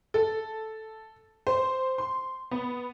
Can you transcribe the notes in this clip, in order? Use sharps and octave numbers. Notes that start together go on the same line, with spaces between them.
A4
C5
C6
B3